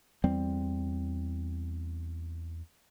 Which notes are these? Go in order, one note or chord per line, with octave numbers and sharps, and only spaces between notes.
E2 G3 C4